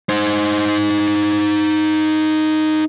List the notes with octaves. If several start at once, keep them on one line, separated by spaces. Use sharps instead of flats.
D#4 C5